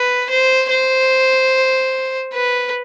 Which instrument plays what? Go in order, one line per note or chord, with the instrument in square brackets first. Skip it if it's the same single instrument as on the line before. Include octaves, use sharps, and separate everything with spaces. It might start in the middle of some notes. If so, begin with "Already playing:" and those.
Already playing: [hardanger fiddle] B4
C5
C5
B4